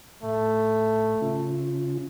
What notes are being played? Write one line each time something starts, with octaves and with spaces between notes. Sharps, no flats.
A2 A3
C#3 C#4 F4